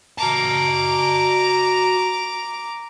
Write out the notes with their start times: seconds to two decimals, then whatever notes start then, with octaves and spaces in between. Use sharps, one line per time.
0.18 F#4 A5 A#5 D6